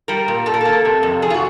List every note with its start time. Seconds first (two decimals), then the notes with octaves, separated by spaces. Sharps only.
0.08 G3 A#4
0.28 A#2
0.46 A#2 A4
0.54 A#4
0.61 A#3 A4
0.85 C3
1.03 F2
1.22 F2 G#4
1.30 F4
1.34 F#4